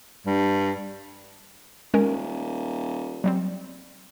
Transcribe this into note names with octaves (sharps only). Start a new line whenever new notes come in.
G2
D#1 G#3 C#4 A#4
F#3 G3 C4